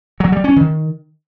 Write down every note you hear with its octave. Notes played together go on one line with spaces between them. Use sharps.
F#3
G3
C#4
D#3